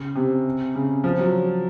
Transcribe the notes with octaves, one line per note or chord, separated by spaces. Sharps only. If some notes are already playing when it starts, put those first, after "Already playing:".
Already playing: C#3
C3
C#3
F3
F#3